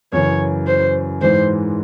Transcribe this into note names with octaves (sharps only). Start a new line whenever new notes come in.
F#2 C#3 E3 C#5
C5
G#2 E3 G#3 C5